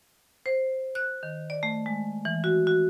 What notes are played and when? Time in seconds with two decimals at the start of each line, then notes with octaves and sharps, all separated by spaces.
0.46 C5
0.95 F#6
1.23 D#3
1.50 D5
1.63 A3
1.86 G#3
2.25 E3
2.44 F#4
2.67 F#4